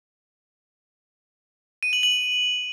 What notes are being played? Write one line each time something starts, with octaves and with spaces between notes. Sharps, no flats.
D#7
F#7
F#7